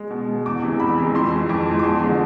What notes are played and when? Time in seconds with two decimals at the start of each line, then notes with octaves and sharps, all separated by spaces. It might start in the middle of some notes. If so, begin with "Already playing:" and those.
Already playing: G#3
0.10 B2
0.29 G#3
0.46 E2 D6
0.63 C3 E3 G#3
0.80 E2 B5
0.98 C3 E3 G#3
1.15 F2 C6
1.32 E3 G#3
1.49 F2 D6
1.66 E3 G#3
1.79 D6
1.84 E2 C6
2.01 D3 F3 G#3